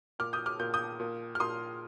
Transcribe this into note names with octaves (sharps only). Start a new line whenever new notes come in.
A#2 D6 F6
D#6 G6
D6 F6
A#2 G6
D#6 G6
A#2
F6
A#2 C6 D#6